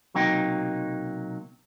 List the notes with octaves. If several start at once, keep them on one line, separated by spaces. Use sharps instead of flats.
B1 C3 F#3 A#3 D#4 G5